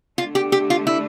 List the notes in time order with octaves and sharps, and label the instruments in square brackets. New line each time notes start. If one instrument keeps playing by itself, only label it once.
[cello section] D3 A3 D4 [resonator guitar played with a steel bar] F4
[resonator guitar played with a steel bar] G4
G4
F4
E4